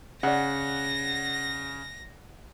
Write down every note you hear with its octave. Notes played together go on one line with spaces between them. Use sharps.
C#3 D5 F#5 A#6